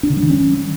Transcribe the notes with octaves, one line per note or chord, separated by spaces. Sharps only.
D4
D3
G3
D#3
C#4